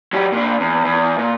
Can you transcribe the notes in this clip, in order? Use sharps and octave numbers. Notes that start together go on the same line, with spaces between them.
F#3 G4
A#2 D4
E2
E2
A#2